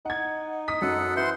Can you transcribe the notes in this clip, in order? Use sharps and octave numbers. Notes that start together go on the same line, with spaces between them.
D#4 F#5 G#6
D#6 B6
F#2 A4 F#5
E3 C5 F#5 C6